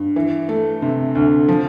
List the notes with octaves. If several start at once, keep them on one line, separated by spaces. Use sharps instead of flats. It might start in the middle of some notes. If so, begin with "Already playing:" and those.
Already playing: G2
E3
A3
C3
D2
F3